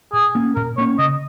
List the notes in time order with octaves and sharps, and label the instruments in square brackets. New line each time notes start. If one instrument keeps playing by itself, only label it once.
[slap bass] A#2 [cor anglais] G#4
[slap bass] A#3 C#4
[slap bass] A#2 [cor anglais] A#4
[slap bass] A#3 C#4 [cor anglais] C#5
[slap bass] C#3 [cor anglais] D#5